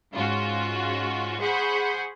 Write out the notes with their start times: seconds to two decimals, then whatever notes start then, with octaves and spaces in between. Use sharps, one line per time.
0.14 G#2 C#4 F4 F#4
1.40 G#4 C5 F#5 B5 C#6 G6